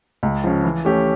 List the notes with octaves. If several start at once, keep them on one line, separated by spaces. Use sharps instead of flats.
C#2
C#3 F3
E3
A3 C#4 G4